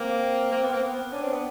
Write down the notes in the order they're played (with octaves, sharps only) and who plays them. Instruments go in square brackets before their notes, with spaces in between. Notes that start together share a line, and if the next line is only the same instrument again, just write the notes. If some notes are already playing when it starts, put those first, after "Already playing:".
Already playing: [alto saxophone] A#3 [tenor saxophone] C4
[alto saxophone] A#3
B3
A#3
B3
[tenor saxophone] C#4 [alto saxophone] D4
[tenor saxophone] C4
B3